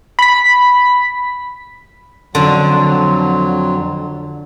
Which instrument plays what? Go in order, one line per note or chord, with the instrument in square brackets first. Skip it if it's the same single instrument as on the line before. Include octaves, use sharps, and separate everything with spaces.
[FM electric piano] B5 B6
[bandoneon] F2 F#3 [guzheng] D3 [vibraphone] C6